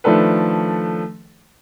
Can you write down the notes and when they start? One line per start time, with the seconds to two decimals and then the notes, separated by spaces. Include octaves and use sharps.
0.04 D#3 F3 A3 D4 A4 B4